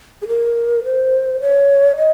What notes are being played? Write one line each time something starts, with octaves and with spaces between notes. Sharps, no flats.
G#4
A#4
C5
C#5
D#5